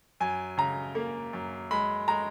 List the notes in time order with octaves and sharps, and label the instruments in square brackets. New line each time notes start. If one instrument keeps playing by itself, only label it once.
[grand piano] F#2 G#5
C#3 A#5
A#3
F#2
G#3 B5
G#3 A#5